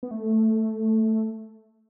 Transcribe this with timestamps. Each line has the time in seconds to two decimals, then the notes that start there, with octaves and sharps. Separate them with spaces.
0.03 B3
0.11 A3